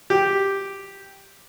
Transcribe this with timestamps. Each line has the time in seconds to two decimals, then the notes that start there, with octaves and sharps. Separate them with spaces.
0.10 G4